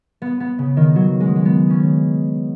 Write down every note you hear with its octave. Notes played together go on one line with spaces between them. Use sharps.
B3
B3
C#3
D#3
F#3
G#3
G#3
B3
C#4